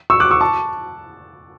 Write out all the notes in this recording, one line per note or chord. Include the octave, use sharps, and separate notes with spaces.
C#6 E6
D6 F#6
C#6 E6
A5 C#6